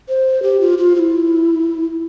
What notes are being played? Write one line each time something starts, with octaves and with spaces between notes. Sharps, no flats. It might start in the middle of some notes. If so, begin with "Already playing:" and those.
C5
G4
F4
F4
F4
E4